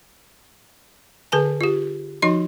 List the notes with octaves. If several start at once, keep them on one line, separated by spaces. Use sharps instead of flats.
D3 G#4 B4 G#5 A5
F4 G4
F3 D#4 F#4 D#5 C6